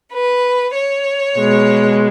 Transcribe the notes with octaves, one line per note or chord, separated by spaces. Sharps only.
B4
C#5
B2 G#3